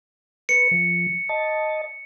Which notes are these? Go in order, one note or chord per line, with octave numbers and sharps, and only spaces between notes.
B4 C#7
F3
D#5 A5